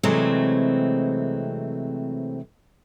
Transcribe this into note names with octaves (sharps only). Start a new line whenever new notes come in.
C3 E3 F#3 G#3 A3 C4